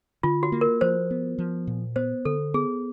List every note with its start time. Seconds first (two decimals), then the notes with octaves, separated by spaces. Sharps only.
0.23 D3 F4
0.43 F#4
0.52 A#3
0.61 A#4
0.81 F3 C5
1.11 B3
1.39 F3
1.67 A#2
1.96 B3 C5
2.25 D3 A4
2.54 B3 G#4